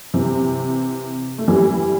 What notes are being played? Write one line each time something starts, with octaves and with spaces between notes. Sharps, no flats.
C3 E3
A3
E3 G3